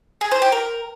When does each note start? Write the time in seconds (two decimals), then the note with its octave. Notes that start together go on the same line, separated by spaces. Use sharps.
0.21 G#4
0.31 C5
0.42 G4
0.52 A#4